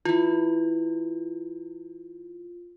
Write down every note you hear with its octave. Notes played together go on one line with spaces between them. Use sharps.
E3 E4 F4